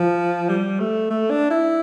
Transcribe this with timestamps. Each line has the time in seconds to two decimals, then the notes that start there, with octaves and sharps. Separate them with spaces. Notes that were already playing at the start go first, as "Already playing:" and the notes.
Already playing: F3
0.49 G3
0.80 A3
1.10 A3
1.30 D4
1.51 E4